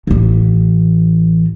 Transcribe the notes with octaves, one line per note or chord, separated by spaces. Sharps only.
A1 E3